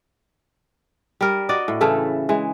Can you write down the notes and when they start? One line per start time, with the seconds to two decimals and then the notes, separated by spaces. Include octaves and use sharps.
1.21 G3 A#4
1.49 F#4 D5 D#5
1.68 A2
1.81 C#3 E3 A3 A4
2.29 E3 G#3